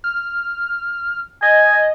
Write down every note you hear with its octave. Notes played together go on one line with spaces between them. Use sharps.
F6
D#5 G#5